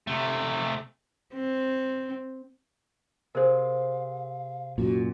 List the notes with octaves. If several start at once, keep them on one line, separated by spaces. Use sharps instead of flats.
C3 A3
C4
C3 G#4 A#4 C5 F5
F#2 A#2 F#4